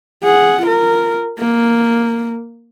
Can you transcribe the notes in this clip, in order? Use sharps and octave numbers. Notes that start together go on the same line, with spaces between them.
G#4 F#5
F4 A#4
A#3